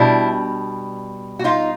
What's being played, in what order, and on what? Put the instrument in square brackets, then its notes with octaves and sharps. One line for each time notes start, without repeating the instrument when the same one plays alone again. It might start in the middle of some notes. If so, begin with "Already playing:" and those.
Already playing: [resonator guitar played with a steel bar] B2 G3 D4 E4
F#4
D#4 F4